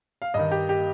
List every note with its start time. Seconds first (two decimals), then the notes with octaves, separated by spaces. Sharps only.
0.22 F5
0.34 G2 D#3 D#5
0.51 G4
0.69 G4